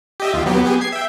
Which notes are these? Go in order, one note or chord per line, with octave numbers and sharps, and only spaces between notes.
G4 D#5 E5
D#2 F4
F#3 B3 G4
B3 G4 G#4
G#6 C7
E5 G5